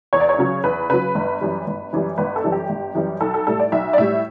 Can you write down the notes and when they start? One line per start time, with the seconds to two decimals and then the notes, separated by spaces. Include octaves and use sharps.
0.13 E2 C#5
0.20 D5
0.29 C#5
0.38 C#3 F#3
0.64 E2 B4
0.89 C#3 F#3 B4
1.15 G1
1.41 F#2 E3 G3
1.67 G1
1.93 F#2 E3 G3
2.18 G1 B4
2.36 A4
2.44 F#2 E3 G3
2.52 G4
2.70 G1
2.95 F#2 E3 G3
3.21 B1 A4
3.34 A4
3.47 A2 G3 A4
3.60 D5
3.72 B1 E5
3.93 D5
3.98 A2 G3 E5